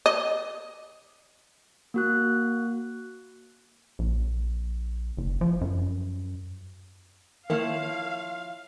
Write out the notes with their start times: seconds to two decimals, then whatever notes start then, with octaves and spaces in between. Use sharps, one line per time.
0.06 D#5
1.94 A#3 F#4 F#6
3.99 A#1
5.17 F#1
5.41 F3
5.61 F#2
7.50 D#3 F3 A#3 E4 C#5 F5 F6